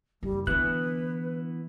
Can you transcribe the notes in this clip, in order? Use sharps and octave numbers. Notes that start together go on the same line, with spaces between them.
F#1 G3
D3 E3 B3 D4 E4 B4 F#6